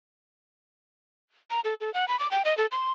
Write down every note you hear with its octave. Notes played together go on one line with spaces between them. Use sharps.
A#5
A4
A4
F#5
B5
D6
G5
D#5
A4
C6